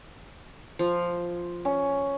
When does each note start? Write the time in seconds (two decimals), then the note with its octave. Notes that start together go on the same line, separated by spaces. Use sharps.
0.79 F3
1.65 C#4